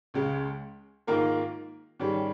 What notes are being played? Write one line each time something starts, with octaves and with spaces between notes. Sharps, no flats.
C#2 C#3 G#3
G#2 D#3 A#3 F4 A#4
G#2 D#3 G3 C#4